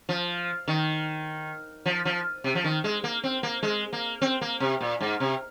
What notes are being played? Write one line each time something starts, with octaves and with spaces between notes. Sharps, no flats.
F3
D#3
F3
F3
C3
F3
D#3
G#3
A#3
C4
A#3
G#3
A#3
C4
A#3
C3
A#2
G#2
C3